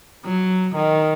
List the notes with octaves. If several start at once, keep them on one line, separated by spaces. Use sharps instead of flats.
F#3
D#3